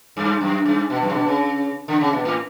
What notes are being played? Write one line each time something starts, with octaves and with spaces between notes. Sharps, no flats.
G2
F#2
G2
B2
F#2
C#3
B2
C#3
D3
C#3
B2
A2